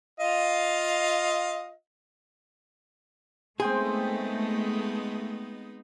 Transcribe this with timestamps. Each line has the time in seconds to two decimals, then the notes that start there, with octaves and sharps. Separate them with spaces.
0.20 F4 D#5 F5
3.60 G#3 A3 B3 C4 D#4 G#4 G5 C6